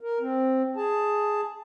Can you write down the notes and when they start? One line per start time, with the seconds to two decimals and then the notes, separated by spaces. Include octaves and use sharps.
0.01 A#4
0.21 C4
0.76 G#4 A5